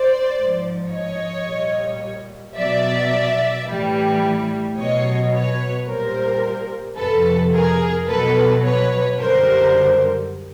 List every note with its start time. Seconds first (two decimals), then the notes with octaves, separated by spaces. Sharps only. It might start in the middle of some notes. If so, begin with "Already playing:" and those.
Already playing: C5 D5
0.36 G#2 F3
0.91 C#5 D#5
1.46 A#2 G3
2.56 B2 F#3 D5 E5
3.67 A2 E3 G3
4.77 B2 F#3 C#5 D#5
5.32 B4 C#5
5.87 A#2 G3 A#4 C5
6.98 F2 C3 F3 A4 B4
7.53 G#4 A#4
8.08 B2 F#3 A4 B4
8.64 B4 C#5
9.19 F#2 D3 G3 A#4 C5